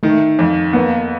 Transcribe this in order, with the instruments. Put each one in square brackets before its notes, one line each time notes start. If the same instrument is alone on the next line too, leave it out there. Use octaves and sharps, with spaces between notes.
[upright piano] D#3 [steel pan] A3
[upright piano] F2
[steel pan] A#3 [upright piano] B3